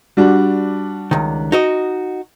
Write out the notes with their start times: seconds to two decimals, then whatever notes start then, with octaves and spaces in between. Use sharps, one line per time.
0.17 G3 D4 F#4
1.11 C#2 D#3
1.52 D#4 F#4 D#5